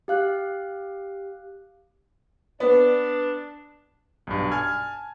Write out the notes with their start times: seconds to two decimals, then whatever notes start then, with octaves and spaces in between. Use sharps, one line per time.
0.08 G4 F5 F#6
2.60 B3 D4
4.27 B1 G2
4.51 G#5 A5 F6 G#6